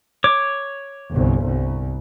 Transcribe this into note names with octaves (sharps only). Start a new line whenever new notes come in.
C#5 D6
G1 C2
C2